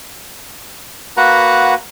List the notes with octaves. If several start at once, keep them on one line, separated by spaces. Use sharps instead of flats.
A#3 F#4 B4 F#5 A#5